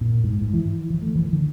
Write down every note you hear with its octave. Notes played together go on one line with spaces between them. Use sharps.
A#2
G#2
G#2
E3
E3
A3
E3
D3